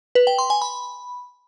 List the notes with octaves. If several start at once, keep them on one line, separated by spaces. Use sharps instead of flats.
B4
G5
C6
G#5
B5